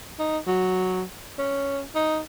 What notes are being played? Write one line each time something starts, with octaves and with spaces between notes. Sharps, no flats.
D#4
F#3
C#4
D#4